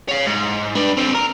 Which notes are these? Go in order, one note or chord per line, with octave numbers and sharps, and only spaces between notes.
C#5 F5
G#2
D4 B4
D3 C4
A#4